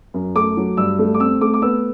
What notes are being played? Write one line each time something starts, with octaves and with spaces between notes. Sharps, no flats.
F#2
A3 D6
F#3
G2 E6
A3
D6
C4 E6
A3 D6
D6
B3 E6